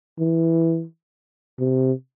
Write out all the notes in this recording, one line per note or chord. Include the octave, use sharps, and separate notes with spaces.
E3
C3